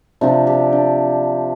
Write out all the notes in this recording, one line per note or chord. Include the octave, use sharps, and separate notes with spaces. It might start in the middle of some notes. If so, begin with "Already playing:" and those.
C3 F3 C4 D4
G4
D4